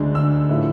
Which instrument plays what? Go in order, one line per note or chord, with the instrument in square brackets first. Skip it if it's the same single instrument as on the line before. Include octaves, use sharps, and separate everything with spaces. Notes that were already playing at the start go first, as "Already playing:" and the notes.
Already playing: [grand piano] D2 D3 G#3 D4
E6
A2 F3 A3 E4